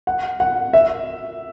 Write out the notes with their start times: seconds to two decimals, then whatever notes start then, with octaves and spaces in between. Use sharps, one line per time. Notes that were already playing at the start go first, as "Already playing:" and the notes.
0.07 F#5
0.40 F#5
0.73 E5